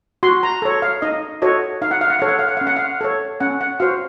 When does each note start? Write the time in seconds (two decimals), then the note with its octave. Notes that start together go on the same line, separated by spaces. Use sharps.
0.23 F#4 C6
0.43 A#5
0.62 A4 C#5
0.82 F5
1.02 D#4 D#5
1.42 F#4 A4 C#5 D#5
1.82 D#4 F5
1.91 F#5
2.01 F5
2.10 F#5
2.19 A4 C#5 F5
2.29 F#5
2.39 F5
2.48 F#5
2.57 C#4 F5
2.67 F#5
2.76 F5
3.01 A4 C#5
3.40 C#4 F#5
3.61 F#5
3.80 F#4 C5 F5